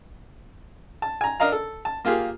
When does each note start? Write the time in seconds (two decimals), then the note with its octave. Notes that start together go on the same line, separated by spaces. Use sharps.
1.02 A5
1.21 G#5 A#5
1.40 D4 A#4 D#5 F5 A#5
1.52 A4
1.85 A5
2.05 A#3 F4 G4 G#4